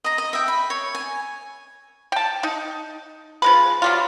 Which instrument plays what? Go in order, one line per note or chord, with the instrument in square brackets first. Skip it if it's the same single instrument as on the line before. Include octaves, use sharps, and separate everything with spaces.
[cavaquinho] D#5 A#5
D#5
E5 G5
B5
C#5
G#5
[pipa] G5 A5
D#4
F3 G#3 B4
F#3 G3 F4